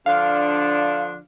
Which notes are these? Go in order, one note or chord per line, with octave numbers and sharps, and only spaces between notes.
D3 F3 D4 F5